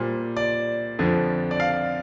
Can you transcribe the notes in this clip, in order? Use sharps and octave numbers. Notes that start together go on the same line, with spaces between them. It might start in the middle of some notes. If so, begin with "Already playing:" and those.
Already playing: A#2 G3 C5
D5
F2 D3 F3
D5
F5